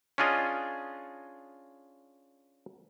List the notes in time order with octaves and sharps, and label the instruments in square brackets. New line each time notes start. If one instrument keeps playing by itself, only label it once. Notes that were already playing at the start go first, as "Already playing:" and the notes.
[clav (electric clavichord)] C#4 D4 F4 G#4 D#5